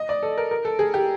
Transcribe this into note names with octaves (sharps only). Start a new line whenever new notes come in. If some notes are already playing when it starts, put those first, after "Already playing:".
Already playing: D#5
D5
A4
A#4
A#4
A4
G#4
G4